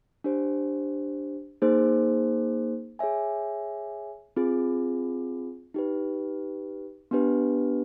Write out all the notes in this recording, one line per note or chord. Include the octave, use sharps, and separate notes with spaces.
D4 G4 C5
A#3 D#4 G#4 C5
G#4 C#5 E5 G#5
C4 F4 G#4
D#4 G4 B4
B3 D4 G4 B4